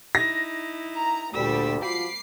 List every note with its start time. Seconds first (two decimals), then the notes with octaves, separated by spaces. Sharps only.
0.15 D#4 E4 A#6
0.97 A#5
1.34 D2 A#2 G3 E6 B6
1.82 F3 F4 F#4 B5 D6 C7